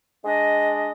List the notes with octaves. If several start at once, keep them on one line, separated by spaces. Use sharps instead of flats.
G#3 D4 D#5